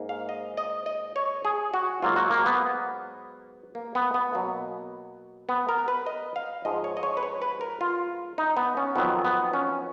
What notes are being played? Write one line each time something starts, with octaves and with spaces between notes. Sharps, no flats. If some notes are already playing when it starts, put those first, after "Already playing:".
Already playing: G#2 A#3
F5
D#5
D#5
D#5
C#5
G#4
F#4
G#2 F#3 A#3 F4
F#4
A#3
B3
A#3
B3
B3
B2 F#3 A#3
B3
A#4
B4
D#5
F5
G#2 F3 G#3 D#5
C#5
D#5
C#5
B4
C#5
B4
A#4
F4
D#4
B3
C#4
F2 D#3 F#3 B3
B3
C#4